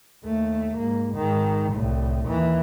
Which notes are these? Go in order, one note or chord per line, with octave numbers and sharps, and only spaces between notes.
D#2 A3
G#2 A#3
G#2 D#3
C2 A2
D#2 E3